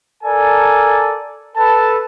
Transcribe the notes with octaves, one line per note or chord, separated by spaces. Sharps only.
A4 A#4 D5 G#5 A5
A4 B4 A5